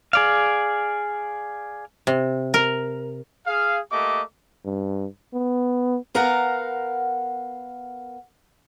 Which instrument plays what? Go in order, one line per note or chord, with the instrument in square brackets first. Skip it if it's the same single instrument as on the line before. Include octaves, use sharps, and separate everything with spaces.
[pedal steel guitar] G#4 D5 F5
[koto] C3
A#4
[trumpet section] G#4 F5
A3 A#3 G4 D#5 D6
[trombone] G2
B3
[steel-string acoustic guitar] B3 A#4 F5 F#5 A#5